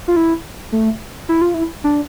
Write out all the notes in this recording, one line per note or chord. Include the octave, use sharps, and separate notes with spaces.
F4
E4
A3
E4
F4
E4
D4